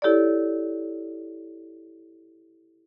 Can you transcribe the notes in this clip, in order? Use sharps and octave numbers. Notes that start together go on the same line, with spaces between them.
E4 G4 A4 C#5 D5